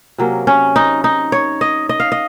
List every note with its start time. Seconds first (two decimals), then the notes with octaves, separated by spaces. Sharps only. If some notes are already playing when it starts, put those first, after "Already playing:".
0.18 C3 F#3 A#3 C#4
0.47 C#4
0.76 D#4
1.04 D#4
1.32 C#5
1.61 D#5
1.89 D#5
2.00 F5
2.12 D#5